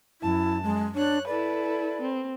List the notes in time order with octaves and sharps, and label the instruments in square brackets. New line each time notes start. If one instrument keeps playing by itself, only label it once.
[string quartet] F#2 A5 [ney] E4
[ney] G#3
[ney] D4 [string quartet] C#5 F#6
[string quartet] E4 A4 B4 [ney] D5
[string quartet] C4